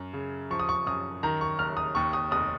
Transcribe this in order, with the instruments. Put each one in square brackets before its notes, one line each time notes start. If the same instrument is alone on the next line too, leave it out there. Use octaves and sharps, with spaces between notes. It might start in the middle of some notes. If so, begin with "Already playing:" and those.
Already playing: [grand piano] F#2
C#3
F3 C#6
D#6
C#6
F#2 D#6
D#3 A#5
C#6
F#1 F6
D#6
D#2 C#6
D#6
F1 D#6